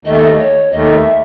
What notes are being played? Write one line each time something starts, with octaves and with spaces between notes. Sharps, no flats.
D#2 D#3 A3 D#5
E5
D#5
C#5
D#2 D#3 A3 D#5
E5